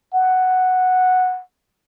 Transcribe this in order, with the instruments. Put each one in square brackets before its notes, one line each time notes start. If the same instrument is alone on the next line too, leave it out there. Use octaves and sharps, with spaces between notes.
[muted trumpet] F#5